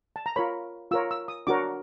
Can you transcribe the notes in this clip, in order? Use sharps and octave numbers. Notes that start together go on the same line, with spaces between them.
A5
A#5
F4 A#4 C#5 B5
F4 A#4 C#5 E6
E6
D#6
D4 F#4 A#4 C#5 D6